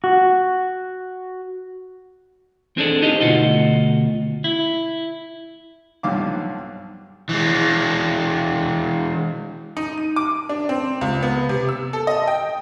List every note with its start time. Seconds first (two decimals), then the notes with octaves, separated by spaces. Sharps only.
0.04 F#4
2.77 C4 D4 G#4 A4 C5 D5
3.02 D#4 G4 G#4 B4 D#5
3.21 D2 G2 B2 F4 F#4 D#5
4.44 E4
6.03 B1 G2 F3 F5 D6
7.29 E3 G#3
9.77 D#4
9.98 D#7
10.16 D6
10.49 D4
10.69 C4
11.01 C#2
11.23 B3
11.49 C3
11.69 E6
11.93 A4
12.07 D#5
12.28 G5